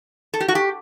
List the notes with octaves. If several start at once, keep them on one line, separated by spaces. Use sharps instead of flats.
A4
G4
F#4
G4